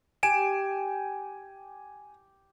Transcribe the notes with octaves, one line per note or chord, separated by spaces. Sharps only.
G4 G#5 D7 E7